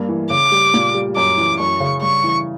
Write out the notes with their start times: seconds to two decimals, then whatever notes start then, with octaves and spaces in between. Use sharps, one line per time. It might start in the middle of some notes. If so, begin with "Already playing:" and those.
Already playing: G2 A#3
0.09 E3
0.30 C#3 D6
0.52 G3
0.74 A#2
0.94 G3
1.16 F#2 D6
1.37 E3
1.59 F#2 C#6
1.80 C#3
2.02 G2 C#6
2.24 E3